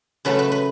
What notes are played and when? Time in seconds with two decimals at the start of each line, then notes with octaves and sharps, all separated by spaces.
0.25 C#3 F#3 A3 B4
0.39 B4
0.52 B4